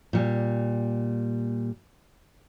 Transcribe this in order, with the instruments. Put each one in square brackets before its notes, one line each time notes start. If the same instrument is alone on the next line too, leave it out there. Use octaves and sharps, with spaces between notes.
[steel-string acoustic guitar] A#2 G3